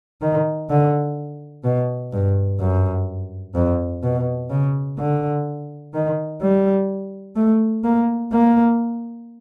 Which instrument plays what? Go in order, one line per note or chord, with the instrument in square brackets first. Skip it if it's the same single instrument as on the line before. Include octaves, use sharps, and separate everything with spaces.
[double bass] D#3
D3
B2
G2
F#2
F2
B2
C#3
D3
D#3
G3
A3
A#3
A#3